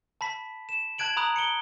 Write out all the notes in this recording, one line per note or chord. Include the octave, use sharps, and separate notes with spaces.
A5 B5 B6
E7
A5 F#6 G#6 D7 F#7
A#5 B5 D#6 F#6
C#7 D7 G7